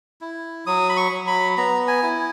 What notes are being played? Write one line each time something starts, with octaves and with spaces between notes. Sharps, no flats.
E4
F#3 D#6
B5
C#6
F#3
B5
B3 A#5
G#5
E4